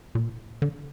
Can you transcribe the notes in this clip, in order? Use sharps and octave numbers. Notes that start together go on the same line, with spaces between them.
A#2
D3